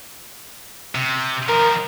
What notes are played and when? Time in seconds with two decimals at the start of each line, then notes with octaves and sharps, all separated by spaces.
0.95 C3
1.49 D#3 F3 A#4